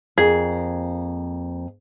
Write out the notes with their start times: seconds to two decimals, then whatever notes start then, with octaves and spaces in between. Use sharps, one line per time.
0.18 F2 A#3 G#4 F5